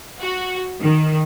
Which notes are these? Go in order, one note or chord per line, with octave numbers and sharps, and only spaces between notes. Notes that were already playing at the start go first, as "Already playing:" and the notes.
F#4
D#3